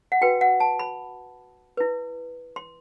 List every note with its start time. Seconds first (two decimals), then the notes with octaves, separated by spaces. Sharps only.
0.12 F#5
0.21 F#4 B4 G5
0.41 F#5
0.60 A5
0.79 B5
1.77 E4 B4
2.56 C6